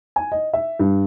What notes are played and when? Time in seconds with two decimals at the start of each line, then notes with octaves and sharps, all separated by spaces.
0.16 G#5
0.32 D#5
0.53 E5
0.79 G2